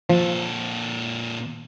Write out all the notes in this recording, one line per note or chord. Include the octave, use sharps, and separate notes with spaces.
A#2 F3 A4